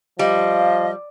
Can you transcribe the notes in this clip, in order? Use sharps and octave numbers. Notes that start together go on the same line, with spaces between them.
F3 G3 D#5 F5